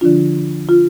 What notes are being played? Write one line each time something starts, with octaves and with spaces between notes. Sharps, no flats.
D3 F3 D4 F4
F4